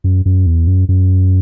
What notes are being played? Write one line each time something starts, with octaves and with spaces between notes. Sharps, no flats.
F#2
F#2
E2
F#2
F#2